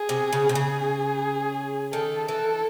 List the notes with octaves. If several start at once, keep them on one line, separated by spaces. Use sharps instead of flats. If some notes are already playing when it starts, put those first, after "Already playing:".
Already playing: G#4
C3
C#3
C3
C#3 G#4
D#3 A4
E3 A4